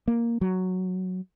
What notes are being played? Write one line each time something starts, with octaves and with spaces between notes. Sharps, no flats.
A#3
F#3